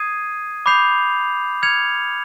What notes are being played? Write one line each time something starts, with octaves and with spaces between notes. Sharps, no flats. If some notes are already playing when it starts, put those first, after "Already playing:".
Already playing: D#6 G#6 C7 D#7
B5 D6 G6 C7 F7
F6 G#6 C#7 F7